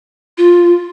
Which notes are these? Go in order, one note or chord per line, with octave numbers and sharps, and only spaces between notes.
F4